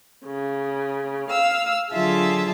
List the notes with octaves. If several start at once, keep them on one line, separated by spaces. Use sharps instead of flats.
C#3
F5 E6
D3 F#3 F4 G#4 E5 A5